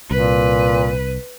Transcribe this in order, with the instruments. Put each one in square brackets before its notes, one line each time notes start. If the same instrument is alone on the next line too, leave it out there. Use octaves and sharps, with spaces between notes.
[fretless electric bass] C2 [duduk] A#2 [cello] B4